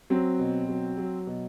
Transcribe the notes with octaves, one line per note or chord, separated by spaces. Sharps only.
F#3 C4
B2
F#3
F#3
B2